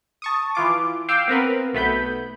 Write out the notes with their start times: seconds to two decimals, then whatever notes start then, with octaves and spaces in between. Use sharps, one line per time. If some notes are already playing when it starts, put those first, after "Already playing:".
0.22 A5 C#6 D#6
0.55 E3 F4 D6
1.08 F5 G5 D6 E6 C7
1.28 B3 C4 A#4 B4
1.73 B1 A3 B3 B5 G6